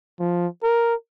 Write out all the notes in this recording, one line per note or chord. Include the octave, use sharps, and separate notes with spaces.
F3
A#4